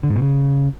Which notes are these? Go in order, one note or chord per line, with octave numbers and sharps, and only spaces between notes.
D3
G#2
B2
C#3